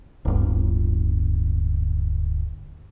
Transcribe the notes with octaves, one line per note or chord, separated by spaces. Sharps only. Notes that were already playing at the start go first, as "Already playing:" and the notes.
D1 G1